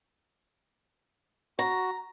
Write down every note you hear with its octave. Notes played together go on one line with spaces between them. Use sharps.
F#4 A#5